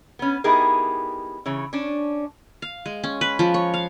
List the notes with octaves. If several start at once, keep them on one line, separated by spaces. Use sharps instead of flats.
B3 C#4
B3 D#4 E4 G4 G#4 A#4
C#3 E3 C#5
C#4 D4
F5
G#3
C#4
B4
F3
C#5
F5